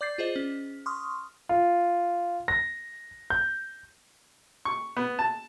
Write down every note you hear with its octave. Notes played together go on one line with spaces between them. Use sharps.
D5 D6 G6 A6 C7
F4 G#4 C5 D#5
C#4
C6 C#6 D#6 F6
F4
A#6
G6
C#6
B3
A5